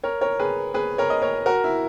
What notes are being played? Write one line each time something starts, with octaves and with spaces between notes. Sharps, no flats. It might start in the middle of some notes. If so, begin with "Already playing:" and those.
A#4 C#5
A#4 C#5
G#4 B4
G#4 B4
A#4 C#5
D#5
A#4 C#5
F#4 A#4
E4